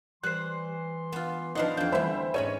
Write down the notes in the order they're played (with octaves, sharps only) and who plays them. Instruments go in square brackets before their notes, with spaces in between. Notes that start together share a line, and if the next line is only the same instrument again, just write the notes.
[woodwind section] E3 C6 [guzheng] G3 [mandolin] C5 F#6
[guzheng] B3 F4
[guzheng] F3 D4 F#5 [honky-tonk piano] D#4 B4 [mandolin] C5 F5 [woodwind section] D5
[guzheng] F2 D4 [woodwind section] F5 [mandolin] G5
[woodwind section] D3 G3 [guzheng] E3 A3 [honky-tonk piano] C5 E5 B5
[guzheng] G#2 C#4 B5 [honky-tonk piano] C#5 D#7 [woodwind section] D#5